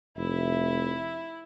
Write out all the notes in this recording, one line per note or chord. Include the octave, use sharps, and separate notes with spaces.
F1 E4 E5